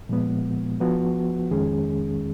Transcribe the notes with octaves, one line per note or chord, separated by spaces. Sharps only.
A#2 F3 G#3 B3
F3 B3 F#4 B4
F2 D#3 G#3 C#4 G#4